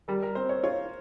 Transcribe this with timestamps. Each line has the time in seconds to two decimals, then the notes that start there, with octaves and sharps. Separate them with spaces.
0.08 G3 A#4
0.23 A#4
0.35 C4 C5
0.49 C#5
0.63 F4 C#5